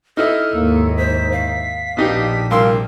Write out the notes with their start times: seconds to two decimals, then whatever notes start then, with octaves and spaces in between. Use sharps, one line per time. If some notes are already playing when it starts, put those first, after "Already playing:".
0.17 D#4 E4 A4 D#5 F6
0.55 D#2 G#2 A#3
0.97 C5 B6
1.32 F5
1.97 A#1 B2 D4 D#4 G4
2.51 C2 A#4 F5 C6 E6